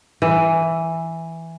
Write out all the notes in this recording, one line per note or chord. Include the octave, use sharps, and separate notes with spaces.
E3